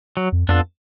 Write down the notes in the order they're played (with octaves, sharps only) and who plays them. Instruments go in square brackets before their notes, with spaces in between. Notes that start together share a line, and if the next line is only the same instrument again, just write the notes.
[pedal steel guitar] F#3
[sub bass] F2
[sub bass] F2 [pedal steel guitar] B3 D4 F4 A4